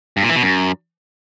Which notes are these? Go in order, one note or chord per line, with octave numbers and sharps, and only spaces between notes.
G2
A#2
E3
B2
F#2